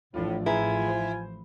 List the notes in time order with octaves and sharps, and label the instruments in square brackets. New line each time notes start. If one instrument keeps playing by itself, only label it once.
[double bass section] A1 E3 F3 [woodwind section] A2 [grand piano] D4 F4
[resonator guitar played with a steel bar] E4 [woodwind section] F4 G#5 [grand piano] G#4 B4 A#5
[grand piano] C5